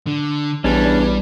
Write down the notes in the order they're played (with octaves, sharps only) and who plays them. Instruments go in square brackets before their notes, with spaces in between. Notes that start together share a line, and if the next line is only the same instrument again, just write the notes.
[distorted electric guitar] D3
[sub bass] A#1 [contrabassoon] E2 [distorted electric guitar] G3 [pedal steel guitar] C#4 D4